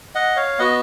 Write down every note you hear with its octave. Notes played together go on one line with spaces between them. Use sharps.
D#5 F#5
C#5 F5
B3 F#4 D#5 F#5